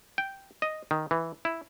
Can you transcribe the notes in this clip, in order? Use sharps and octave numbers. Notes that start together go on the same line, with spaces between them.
G5
D#5
D#3
E3
E4